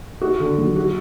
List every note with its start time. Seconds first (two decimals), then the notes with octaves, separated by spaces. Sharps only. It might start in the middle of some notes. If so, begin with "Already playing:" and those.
0.22 F#4
0.40 D3
0.58 F#3
0.76 F#4